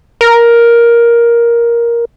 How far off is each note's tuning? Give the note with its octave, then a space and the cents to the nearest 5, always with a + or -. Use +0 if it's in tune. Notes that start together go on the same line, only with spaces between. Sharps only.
A#4 +10